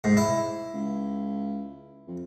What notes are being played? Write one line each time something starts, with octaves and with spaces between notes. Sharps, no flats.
G#2
E4
C#2
F2